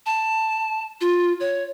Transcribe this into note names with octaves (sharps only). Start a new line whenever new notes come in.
A5
F4
C#5